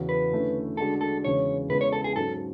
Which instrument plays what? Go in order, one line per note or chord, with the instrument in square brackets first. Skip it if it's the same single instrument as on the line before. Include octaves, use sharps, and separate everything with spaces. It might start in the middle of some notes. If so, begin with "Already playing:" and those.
Already playing: [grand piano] E2 C#3 E3 B3 F#4
[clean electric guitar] B4
[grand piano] D3 A3 C#4 E4
[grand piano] D3 G#3 D4 F#4 [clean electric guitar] A4
[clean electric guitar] A4
[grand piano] E2 C#3 G#3 C#4 [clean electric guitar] C#5
[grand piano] C#3 G#3 B3 E4 [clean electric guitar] B4
[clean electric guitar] C#5
A4
G#4
[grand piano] G#2 F#3 C#4 [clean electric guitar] A4